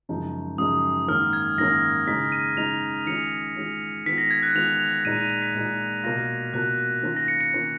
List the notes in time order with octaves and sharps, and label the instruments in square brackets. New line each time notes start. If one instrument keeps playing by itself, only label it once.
[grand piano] F#2 C#3 F3 G#3 D#4
[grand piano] F#2 C#3 F3 G#3 D#4 [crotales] D#6
[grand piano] G#2 D#3 A#3 C#4 [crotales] F6
[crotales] G#6
[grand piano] G#2 D#3 A#3 C#4 [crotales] A#6
[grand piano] C#3 G#3 D#4 [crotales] B6
[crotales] D#7
[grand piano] C#3 G#3 D#4 [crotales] F7
[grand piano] D#3 G#3 C#4 F4 [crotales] C#7
[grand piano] D#3 G#3 C#4 F4
[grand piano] D#3 G#3 B3 F4 [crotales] B6
[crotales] A#6
G#6
F#6
[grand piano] D#3 G#3 B3 F4 [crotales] F7
[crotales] F7
[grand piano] A#2 G#3 D#4 [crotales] D#7
[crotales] D#7
D#7
B6
[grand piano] A#2 G#3 D#4
[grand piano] B2 A#3 F4 [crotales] A#6
[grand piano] B2 A#3 F4 [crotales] F#6
[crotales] F#6
[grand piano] D#3 A#3 C#4 F4
[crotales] A#6
C#7
C#7
[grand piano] D#3 A#3 C#4 F4